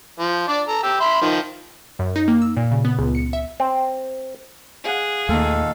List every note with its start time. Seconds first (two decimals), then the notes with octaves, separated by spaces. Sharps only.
0.19 F3
0.48 D4 D5
0.68 A4 A#5
0.83 G4 E6
1.00 E5 B5 C6
1.21 D#3 F3
1.99 F#2
2.16 D#4
2.28 A#3
2.42 E6
2.57 A#2
2.71 C#3
2.85 B3
2.99 C#2
3.15 C#7
3.33 E5
3.60 C4
4.85 G#4 F5 F#5
5.29 D#2 A#2 D#3 A3 A4 F5